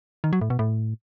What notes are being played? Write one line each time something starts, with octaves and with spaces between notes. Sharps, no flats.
D#3
F#3
A2
B2
A2